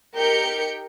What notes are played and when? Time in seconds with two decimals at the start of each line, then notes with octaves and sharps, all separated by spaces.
0.17 D#4 G4 A#4 G5 G6 C#7